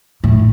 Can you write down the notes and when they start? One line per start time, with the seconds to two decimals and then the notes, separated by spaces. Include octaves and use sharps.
0.24 A2